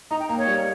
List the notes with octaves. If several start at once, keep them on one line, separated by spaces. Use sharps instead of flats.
D#4 A#5
G5
A#3
C#5
G3